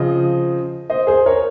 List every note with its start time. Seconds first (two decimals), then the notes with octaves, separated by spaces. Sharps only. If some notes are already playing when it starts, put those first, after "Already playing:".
Already playing: C#3 F3 C4 C5 D#5
0.90 C5 D#5
1.07 G#4 C5
1.26 A#4 C#5